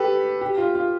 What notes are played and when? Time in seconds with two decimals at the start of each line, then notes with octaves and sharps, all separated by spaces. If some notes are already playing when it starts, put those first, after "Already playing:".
Already playing: G4 A4 B4
0.41 G4
0.58 F4
0.75 F4